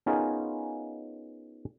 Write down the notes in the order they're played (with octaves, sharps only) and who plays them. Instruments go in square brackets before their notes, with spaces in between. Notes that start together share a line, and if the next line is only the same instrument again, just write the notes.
[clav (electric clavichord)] B3 C#4 D#4 F4 G#4 A#4